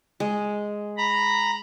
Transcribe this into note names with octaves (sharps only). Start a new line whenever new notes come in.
G#3
A#5 B5